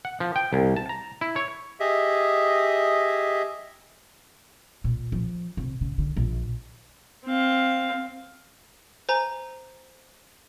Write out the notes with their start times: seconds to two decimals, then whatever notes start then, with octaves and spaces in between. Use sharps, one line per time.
0.05 F#5
0.20 F3
0.36 G5
0.53 C2
0.76 A5
0.89 A#5
1.21 E4
1.36 C#5
1.80 G4 G#4 D#5 E5
4.84 A#2
5.12 F3
5.57 C3
5.81 C#3
5.98 D3
6.16 A#1
7.26 C4 F5
9.09 C5 G#5 A#5